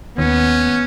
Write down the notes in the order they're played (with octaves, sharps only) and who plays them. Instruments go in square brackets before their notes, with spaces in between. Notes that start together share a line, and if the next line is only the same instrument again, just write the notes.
[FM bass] D#2 [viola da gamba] B3 [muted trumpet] C#4